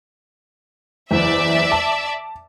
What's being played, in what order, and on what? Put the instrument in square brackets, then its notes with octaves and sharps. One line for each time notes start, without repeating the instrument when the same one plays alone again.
[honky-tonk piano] F#1 E2 [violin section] D5 E5
[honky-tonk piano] A5